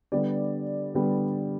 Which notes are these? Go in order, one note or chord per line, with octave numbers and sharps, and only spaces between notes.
D3 G3 B3 D5
D3 G3 B3